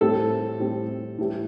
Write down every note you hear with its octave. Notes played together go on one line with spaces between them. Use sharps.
A2 G3 C4 A4
A2 G3 C4
A2 E3 G3